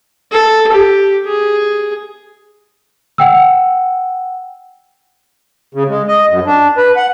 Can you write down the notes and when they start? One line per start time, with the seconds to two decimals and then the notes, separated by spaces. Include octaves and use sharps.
0.32 A4
0.72 G4
1.26 G#4
3.18 F#5 G5 E6
5.75 C#3
5.89 G#3
6.08 D#5
6.29 F#2
6.46 D4
6.77 B4
6.96 F#5